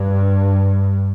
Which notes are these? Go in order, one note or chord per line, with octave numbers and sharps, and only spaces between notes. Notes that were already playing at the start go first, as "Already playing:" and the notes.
Already playing: G2